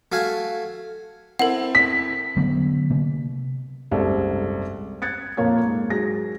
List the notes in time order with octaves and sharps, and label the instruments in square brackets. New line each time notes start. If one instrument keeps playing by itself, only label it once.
[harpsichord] A3 F#4 F5 G#5
[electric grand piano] C4 E4 A4 [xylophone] A#4 F#5
[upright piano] B6
[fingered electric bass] D3 F#3 B3
C3 A#3
[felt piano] F#1 C2 G#2 C4 A4
F#6 G#6 A6 C#7
F2 A#2 A#3 A#4 C#5 G#6
G#2
G#2 F#3 G#4 A#6